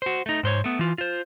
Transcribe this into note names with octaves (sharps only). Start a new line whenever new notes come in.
F#4 C5
A3 D#4
G#2 C5 C#5
A3 B3
E3 F4
F4 C5